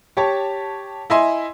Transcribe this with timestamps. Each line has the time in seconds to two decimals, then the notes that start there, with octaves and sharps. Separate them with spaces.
0.17 G4 C#5 A5
1.10 E4 D#5 E5 G#5 C6